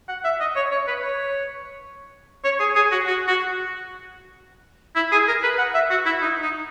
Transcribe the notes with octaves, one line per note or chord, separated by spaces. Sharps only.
F#5
E5
D#5
C#5
C#5
B4
C#5
C#5
G#4
G#4
F#4
F#4
F#4
E4
G#4
A#4
B4
F#5
E5
F#4
E4
D#4
D#4